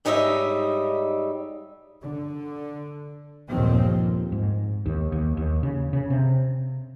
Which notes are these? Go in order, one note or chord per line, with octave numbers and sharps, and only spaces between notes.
G#2 G3 D#4 C#5 D#5 E5
D3
G1 D#2 A#2 D#3 F3 C4
G#2
D#2
D#2
D#2
C#3
C#3
C3